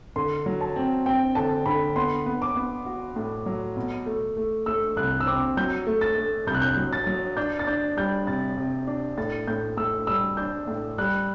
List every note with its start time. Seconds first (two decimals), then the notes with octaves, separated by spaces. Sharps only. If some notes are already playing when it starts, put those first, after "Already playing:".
0.16 D3 C6
0.46 F#3
0.61 A5
0.76 C4
1.06 C4 G5
1.35 D3 A5
1.66 D3 B5
1.96 B3 C6
2.26 B3
2.42 D6
2.56 B3
2.86 F#4
3.16 A2
3.46 F#3
3.77 B2
4.06 A3
4.37 A3
4.66 A3 E6
4.97 C2 F#6
5.20 E6
5.26 C4 D6
5.57 F#3 G6
5.87 A3
6.01 A6
6.17 A3
6.47 C2 G6
6.55 F#6
6.62 G6
6.77 F#3
6.93 A6
7.07 F#3
7.37 D4 G6
7.59 A6
7.67 D4 G6
7.97 G3 G6
8.27 C3 A6
8.57 C3
8.87 D4
9.17 A2 A6
9.47 A2 G6
9.77 A2 E6
10.07 G3 E6
10.37 D4 G6
10.68 A2
10.98 G3 F#6